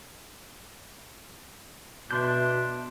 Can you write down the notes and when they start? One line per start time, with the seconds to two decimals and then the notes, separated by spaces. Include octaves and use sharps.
2.11 B2 D4 E5 C6 G6